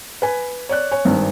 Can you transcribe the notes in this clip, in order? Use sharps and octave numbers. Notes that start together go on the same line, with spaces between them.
B4 G#5
C#5 D5 F#6
C#5 G#5
G#1 G2